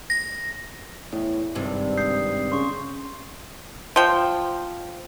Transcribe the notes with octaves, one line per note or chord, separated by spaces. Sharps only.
A#6
E2 A2
G#1 G2 C3 G3
D#6 G6 C7
C#3 C6 C#6
F3 G5